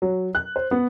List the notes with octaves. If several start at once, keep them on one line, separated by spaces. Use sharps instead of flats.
F#3
F#6
C5
B3